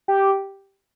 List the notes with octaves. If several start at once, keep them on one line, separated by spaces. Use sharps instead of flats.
G4